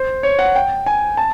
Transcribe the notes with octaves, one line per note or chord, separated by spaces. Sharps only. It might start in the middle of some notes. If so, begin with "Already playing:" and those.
Already playing: C5
C#5
F#5
G5
G#5
A5